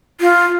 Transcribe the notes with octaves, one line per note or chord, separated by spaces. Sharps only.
F4